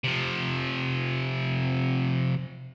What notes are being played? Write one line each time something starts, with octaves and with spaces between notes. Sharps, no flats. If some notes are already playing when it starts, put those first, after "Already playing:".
C3 F3